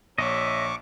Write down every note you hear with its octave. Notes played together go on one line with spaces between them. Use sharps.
A#1 C#5 D#5 E5 C#6 D6